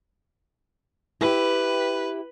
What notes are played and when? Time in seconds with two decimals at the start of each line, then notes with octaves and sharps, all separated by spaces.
1.21 E4 G4 B4